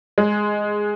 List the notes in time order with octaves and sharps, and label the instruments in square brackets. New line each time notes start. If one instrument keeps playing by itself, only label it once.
[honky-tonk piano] G#3